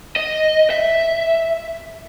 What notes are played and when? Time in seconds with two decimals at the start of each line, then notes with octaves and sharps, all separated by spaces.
0.17 D#5
0.71 E5